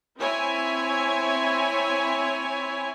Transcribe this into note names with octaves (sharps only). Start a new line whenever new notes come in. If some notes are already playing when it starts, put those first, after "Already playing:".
C4 E4 C#5 G#5